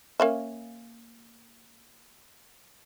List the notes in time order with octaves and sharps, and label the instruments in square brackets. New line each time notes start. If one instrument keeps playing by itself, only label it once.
[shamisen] A#3 C#4 E5